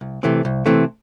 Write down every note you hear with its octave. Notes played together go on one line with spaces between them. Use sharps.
C2
C3 E3 A3 C4
C2
C3 E3 A3 C4